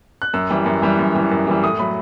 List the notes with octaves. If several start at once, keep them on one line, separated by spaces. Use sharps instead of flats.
F#6
F#2 E6
E3 G3
F#2
E3 G3
F#2
E3 G3
F#2
E3 G3
A2 D#6
F#3 A3 B5